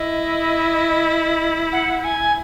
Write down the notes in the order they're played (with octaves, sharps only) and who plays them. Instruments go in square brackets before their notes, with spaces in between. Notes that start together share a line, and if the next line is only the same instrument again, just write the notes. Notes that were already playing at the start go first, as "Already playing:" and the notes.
Already playing: [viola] E4 [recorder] D#5
[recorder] F#5
G#5